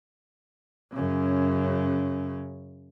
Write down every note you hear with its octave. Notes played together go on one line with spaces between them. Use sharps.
F#2 C#3